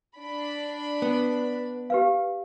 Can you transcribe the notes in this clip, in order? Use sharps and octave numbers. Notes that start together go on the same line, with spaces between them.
D4 B5
B3
G4 B4 F5